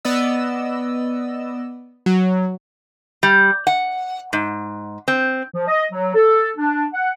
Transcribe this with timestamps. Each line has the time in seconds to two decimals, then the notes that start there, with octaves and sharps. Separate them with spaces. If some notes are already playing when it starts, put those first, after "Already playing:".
0.05 B3 D5 D#5 E6
2.06 F#3
3.23 G3
3.67 F#5
4.33 G#2
5.08 C4
5.54 F3
5.68 D#5
5.92 F#3
6.15 A4
6.57 D4
6.94 F#5